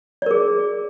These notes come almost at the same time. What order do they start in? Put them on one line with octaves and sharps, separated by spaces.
D5 A#4 G#4